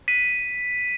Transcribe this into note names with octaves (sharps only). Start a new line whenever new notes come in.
B6 D#7